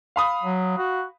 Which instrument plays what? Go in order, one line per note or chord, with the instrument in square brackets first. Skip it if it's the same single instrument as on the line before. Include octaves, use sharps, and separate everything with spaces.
[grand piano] F5 B5 D#6
[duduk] F#3
F#4